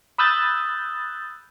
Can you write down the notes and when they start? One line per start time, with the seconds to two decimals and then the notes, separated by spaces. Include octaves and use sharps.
0.18 B5 D#6 E6 F#6 G6 A6